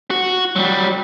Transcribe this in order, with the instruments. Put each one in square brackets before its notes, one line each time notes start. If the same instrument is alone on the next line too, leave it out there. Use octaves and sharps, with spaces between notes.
[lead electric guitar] F#4
F#3 G3